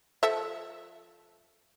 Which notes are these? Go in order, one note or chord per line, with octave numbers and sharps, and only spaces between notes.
F3 A4 E5